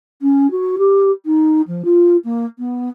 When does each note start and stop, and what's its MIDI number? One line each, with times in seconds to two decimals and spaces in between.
0.22 0.50 61
0.51 0.76 66
0.78 1.11 67
1.26 1.61 63
1.67 1.82 53
1.85 2.17 65
2.24 2.45 58
2.59 2.89 59